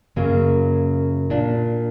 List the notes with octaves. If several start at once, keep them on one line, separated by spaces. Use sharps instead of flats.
F#2 C#3 F#3 A#3
A#2 A#3 D4